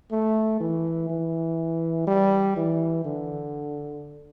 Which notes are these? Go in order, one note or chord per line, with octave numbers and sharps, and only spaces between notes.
A3
E3
E3
G3
E3
D3